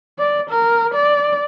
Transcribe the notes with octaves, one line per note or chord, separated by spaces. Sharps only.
D5
A#4
D5